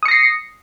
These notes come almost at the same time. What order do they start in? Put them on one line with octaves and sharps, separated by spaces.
D#6 C#7 A#6 C7